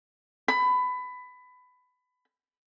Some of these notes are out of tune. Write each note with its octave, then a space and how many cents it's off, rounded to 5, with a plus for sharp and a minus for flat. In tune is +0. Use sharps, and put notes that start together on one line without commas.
B5 +20